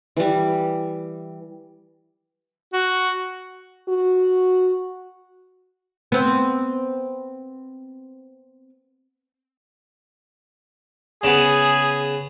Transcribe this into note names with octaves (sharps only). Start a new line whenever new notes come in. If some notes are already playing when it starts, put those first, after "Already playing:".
E3 G3
F#4
F#4
B3 C4
C#3 B3 G#4